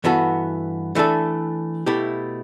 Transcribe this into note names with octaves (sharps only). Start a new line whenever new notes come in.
G2 E3 B3 F#4 A4
E3 A3 D4 A4
B2 A3 E4 G4